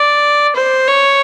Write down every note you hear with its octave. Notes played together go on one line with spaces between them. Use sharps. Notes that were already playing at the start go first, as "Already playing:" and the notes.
Already playing: D5
C5
C#5